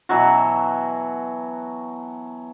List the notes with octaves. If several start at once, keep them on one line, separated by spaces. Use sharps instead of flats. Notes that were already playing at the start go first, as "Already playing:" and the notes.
B2 E3 F#3 F#4